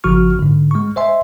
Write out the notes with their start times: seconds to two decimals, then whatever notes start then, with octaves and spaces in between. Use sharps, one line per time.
0.04 G#1 C#3 F3 F#4 C#6 F6
0.39 G#2 D3
0.71 G#3 C#6
0.96 C5 D#5 E5 G#5 C6